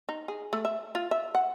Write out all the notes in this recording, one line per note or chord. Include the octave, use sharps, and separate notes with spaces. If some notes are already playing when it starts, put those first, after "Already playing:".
D#4
G#4
A3
E5
F4
E5
F#5